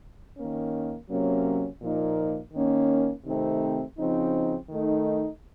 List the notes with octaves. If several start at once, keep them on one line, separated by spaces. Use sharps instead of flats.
D#3 A#3 C#4
C3 F#3 A#3 C#4
A#2 F3 A#3 D#4
D#3 A#3 C#4
C3 D#3 A3 C4 D#4
C#3 F3 C4 D#4
D#3 A3 D#4